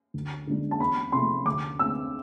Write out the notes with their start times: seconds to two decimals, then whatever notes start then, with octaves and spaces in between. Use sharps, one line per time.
0.14 D2
0.47 D3 G#3 D4
0.71 A5
0.80 E2 B5
1.12 C3 F3 A3 C6
1.45 D2 D6
1.79 D3 A3 C4 E6